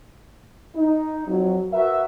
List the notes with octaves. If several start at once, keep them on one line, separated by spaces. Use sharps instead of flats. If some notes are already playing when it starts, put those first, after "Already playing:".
D#4
F2 F#3
F#4 A#4 B4 E5